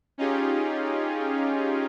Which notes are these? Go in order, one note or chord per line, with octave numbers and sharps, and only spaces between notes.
C#4 D#4 F4 G4 G#4